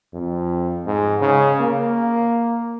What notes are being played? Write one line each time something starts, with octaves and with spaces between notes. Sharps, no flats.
F2
G#2
C#3
A#3